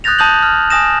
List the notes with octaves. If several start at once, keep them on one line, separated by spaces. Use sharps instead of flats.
D#6 F#6 G6 A6 A#6 F7
A5 D#6 G6 F#7
F6
G#5 D#6 A#6 E7